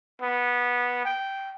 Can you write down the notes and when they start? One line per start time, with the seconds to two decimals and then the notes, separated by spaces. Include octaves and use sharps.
0.22 B3
1.05 G5